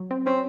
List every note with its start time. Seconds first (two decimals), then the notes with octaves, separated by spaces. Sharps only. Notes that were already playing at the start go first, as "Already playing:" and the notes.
Already playing: F#3
0.11 C4
0.26 C4 C#4